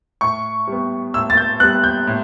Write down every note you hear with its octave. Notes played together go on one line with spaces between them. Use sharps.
A2 C#6
G3 B3
A2 E6
A6
G6
G3 B3 F#6
G6
A2